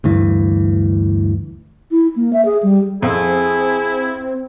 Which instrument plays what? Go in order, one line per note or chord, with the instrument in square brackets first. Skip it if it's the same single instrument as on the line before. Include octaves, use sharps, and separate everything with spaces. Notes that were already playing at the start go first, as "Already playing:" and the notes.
[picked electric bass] D2 G2 E3
[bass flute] E4
A#3
E5
G#4
G3
[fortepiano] F2 [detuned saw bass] C4 [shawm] E4 [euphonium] G#4